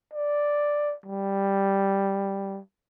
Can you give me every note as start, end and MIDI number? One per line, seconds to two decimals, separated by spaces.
0.13 0.95 74
1.06 2.59 55